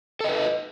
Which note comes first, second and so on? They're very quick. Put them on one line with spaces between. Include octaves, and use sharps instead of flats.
A4 D#5 B4